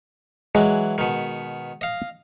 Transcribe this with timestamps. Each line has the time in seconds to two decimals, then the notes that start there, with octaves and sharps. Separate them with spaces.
0.55 E3 F#3 G#3
0.98 B2 D#3
1.81 D#5 F5